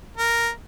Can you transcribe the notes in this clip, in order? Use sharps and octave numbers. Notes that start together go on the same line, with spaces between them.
A#4